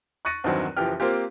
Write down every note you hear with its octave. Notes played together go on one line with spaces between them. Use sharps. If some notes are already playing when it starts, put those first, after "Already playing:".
C#6 F#6 A6 A#6 C#7 D#7
E2 G2 D#3 F#3 C4
F#1 E3 F3 G4 G5 F6
A#3 C4 F4 G4